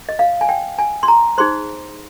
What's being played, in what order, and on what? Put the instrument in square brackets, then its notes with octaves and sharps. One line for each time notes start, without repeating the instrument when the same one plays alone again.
[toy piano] D#5
F5
G#5
G5
G#5
C6
A#5
D#4 G#4 C5 C6